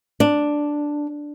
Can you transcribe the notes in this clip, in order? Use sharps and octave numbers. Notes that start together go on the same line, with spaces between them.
D4